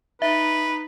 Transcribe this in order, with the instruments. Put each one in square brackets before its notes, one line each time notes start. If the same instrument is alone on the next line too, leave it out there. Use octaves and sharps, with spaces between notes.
[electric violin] D#4 [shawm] B4 [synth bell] E5